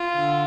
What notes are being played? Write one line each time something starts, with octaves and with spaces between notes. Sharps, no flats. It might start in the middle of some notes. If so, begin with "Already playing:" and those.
Already playing: F4
D3